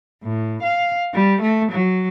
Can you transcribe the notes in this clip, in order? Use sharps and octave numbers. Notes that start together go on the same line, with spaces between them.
A2
F5
G3
A3
F#3